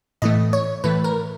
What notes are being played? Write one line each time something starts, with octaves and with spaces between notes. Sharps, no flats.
A2 E3 A3 D#5
C#5
A2 E3 A3 B4
A#4